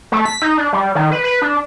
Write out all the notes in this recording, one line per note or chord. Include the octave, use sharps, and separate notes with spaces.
A3
B6
D#4
D4
G3
D#3
B4
B4
D4